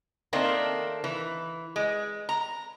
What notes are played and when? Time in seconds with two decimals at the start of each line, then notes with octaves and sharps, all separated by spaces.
0.33 D#3 A3 A#3 C4 D4
1.04 E3
1.76 G#3
2.29 A#5